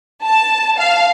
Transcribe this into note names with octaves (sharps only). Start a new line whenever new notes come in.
A5
F5